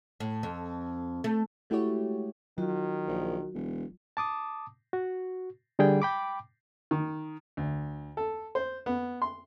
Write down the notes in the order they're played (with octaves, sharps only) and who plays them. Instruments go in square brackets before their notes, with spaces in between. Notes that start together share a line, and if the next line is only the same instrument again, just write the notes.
[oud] A2
F2
A3
[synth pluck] G#3 A3 E4 F#4 G4 C#5
[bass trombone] D#3 [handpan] F#3 F4 [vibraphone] F#4
[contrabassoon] A#1
E1
[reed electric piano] A5 D6 D#6
F#4
D3 G3 G#4 G5
G5 B5 D6
[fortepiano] D#3
D2
A4
C5
B3
C6